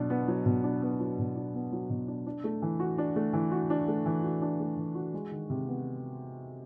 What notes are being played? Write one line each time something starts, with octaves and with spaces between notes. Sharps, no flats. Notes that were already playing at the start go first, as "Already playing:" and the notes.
Already playing: B2 F#3 D4
B3
F#3
B2
D4
B3
F#3
B2
D4
B3
F#3
B2
D4
D4
A3
E3
F#4
D4
A3
E3
F#4
D4
A3
E3
F#4
D4
A3
E3
F#4
G#3
D#3
C3
B3